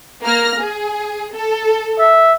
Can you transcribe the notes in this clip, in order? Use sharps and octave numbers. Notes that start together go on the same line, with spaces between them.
A#3 F6 A#6
G#4
A4
E5